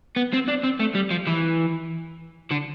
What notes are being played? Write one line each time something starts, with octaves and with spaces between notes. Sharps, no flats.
B3
C4
D4
C4
A3
G3
F3
E3
D3